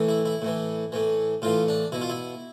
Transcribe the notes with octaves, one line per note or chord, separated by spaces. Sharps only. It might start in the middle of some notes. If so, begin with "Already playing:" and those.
Already playing: A2 E3
E4
E4
A2 E3
A2 E3
A2 E3 F4
D4
B2 E4
F4
E4